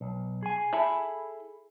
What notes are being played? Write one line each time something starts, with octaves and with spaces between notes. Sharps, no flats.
B1
G#4 G#5
E4 A4 B5